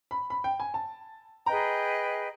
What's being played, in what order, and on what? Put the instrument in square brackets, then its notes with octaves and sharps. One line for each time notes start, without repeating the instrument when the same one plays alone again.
[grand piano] B5
B5
G5
G#5
A5
[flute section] G#4 B4 D#5 G5 [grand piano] A#5